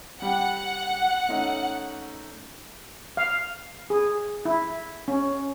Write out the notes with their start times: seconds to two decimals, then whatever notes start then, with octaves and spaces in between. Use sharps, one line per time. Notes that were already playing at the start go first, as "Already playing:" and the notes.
0.22 G3 F#5 G5
1.28 A3 C#4 D#4
3.17 F5
3.90 G#4
4.45 E4
5.08 C#4